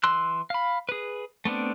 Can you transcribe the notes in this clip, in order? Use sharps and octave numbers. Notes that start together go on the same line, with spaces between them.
E3 C6 E6 F#6
F5 B5
G#4 B4
A3 B3 C4 D4